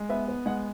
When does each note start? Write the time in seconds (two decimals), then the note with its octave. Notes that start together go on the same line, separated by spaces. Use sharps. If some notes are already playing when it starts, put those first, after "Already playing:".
Already playing: G#3
0.09 B3 E5
0.28 B3
0.46 G#3 F#5